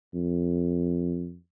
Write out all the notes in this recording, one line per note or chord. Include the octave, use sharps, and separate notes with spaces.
F2